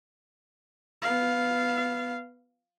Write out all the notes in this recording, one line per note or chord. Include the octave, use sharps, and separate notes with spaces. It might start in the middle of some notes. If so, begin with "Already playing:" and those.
B3 F5